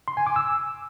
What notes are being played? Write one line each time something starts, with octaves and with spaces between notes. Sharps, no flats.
C6
G#5
D6
E6